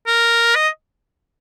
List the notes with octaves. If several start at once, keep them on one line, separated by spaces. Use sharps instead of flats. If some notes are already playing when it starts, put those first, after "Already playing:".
A#4
D#5